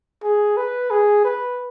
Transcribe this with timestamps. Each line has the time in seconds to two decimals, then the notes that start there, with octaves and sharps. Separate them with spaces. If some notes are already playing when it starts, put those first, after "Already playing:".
0.23 G#4
0.57 B4
0.91 G#4
1.25 B4